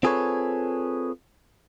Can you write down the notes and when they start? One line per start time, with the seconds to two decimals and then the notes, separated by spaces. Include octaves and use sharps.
0.03 C4 F4 G#4 A4 B4 C#5